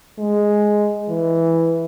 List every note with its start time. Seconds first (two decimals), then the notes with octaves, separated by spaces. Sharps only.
0.19 G#3
1.09 E3